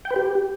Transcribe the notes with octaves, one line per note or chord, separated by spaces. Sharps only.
G5
B4
G4